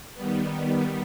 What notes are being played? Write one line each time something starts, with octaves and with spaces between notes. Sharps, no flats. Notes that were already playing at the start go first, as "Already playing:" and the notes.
D#3 G3 B3